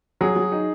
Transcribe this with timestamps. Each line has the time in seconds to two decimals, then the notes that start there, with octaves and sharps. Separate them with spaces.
0.21 F#3 G#4
0.36 F#3
0.52 D#4